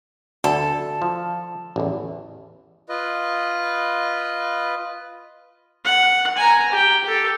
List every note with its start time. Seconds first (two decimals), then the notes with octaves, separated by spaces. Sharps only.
0.44 D2 A4
1.02 F3
1.76 A1 E2
2.89 F4 B4 D#5
5.84 F#5
6.37 G#5 A#5
6.72 G4 G5
7.04 G4 A4